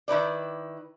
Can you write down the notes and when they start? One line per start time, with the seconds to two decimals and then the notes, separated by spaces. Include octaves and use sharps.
0.08 D#3 E4 B4 D5